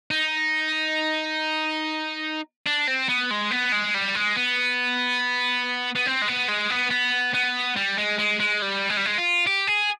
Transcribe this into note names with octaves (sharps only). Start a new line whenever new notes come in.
D#4
D4
C4
B3
G#3
B3
G#3
G3
G#3
B3
B3
C4
G#3
B3
G#3
B3
B3
B3
G3
G#3
G#3
G#3
G3
G#3
G3
G#3
F4
G4
G#4